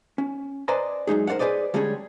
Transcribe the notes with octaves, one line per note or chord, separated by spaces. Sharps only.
C#4
B4 C5 D5 D#5 G#5 A#5
F#2 G#3 D#4 G#4
A#4 C5 D5 F5 F#5
G#4 B4 C5 D5 D#5
D3 G3 G#3 C#4 G#4 C#5